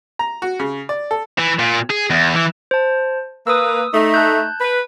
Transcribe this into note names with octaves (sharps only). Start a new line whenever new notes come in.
A#5
F#4
C#3
D5
A4
E3
A#2
G#4
E2
E3
C5 A5
A#3 B4 D#6 E6
A3 D#4
A5 F#6 G6
B4